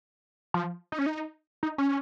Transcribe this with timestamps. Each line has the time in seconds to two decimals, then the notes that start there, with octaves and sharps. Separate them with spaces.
0.54 F3
0.92 D#4
0.99 C#4
1.06 D#4
1.63 D#4
1.78 C#4